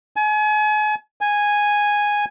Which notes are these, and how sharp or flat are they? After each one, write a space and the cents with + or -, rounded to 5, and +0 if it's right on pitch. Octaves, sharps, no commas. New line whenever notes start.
G#5 +35
G#5 -5